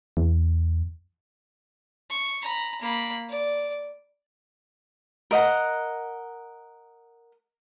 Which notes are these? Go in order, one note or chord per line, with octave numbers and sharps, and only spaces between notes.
E2
C#6
A#5 B5
A#3 B5
D5
A#4 D#5 F#5 A#5